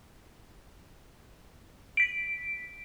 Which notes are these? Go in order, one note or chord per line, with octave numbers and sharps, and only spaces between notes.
B6 D7